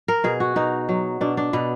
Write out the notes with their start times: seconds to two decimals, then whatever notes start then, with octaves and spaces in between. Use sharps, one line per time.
0.08 A#4
0.24 B2 G#4
0.40 F#4
0.56 B2 D#4
0.89 F#3
1.21 B2 D4
1.37 D4
1.53 B2 B3